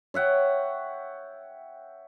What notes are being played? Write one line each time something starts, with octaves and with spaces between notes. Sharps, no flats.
C#5 E5 F#5 G5